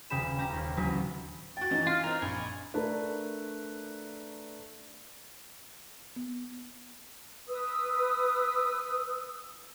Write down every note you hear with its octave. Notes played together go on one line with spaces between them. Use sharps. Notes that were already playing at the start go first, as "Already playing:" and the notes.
D#1 C#3 G4 B5 E7
C#4 G4 A#5
D#2
A1 D2 E3 F#3 B4
F#4 G5 A6
E3 C#4 D#4
F4 F6
C4 A#4 D#5
A#1 G#5 B5
A3 D4 A#4 B4
B3
B4 D#6 E6